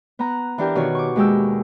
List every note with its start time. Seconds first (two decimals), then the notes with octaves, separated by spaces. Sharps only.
0.19 B3 A#5 F#6
0.58 E3 D4 G4 A#4
0.75 B2 D#3 F#4 C#5
0.95 C#6 D6
1.16 D#2 G#3 G4 E6